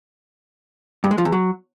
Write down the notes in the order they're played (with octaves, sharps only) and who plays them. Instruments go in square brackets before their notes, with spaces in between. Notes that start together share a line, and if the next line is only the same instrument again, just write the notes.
[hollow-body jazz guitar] G2
G#3
F3
E2
F#3